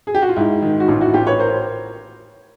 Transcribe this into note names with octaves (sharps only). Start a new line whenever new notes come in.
G#4
G4
F#4
F4
G#2 E4
D#3
F#4
A1 F4
E4 F#4
A1 F4 G4
B4 C#5
A#4 C5